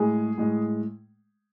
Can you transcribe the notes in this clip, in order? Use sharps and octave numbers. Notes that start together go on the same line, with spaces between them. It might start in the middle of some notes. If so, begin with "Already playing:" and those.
Already playing: A2 G#3 G#4
A2 G#3